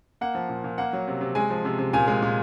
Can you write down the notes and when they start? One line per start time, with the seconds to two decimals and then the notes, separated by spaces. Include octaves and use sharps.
0.21 A#3 F#5
0.35 F3
0.49 A#2
0.64 A#2
0.78 A#3 F#5
0.93 F#3
1.08 C3
1.21 C3
1.35 G#3 G#5
1.50 F3
1.65 C3
1.79 C3
1.93 A#2 G#5
2.08 G#3
2.22 A#2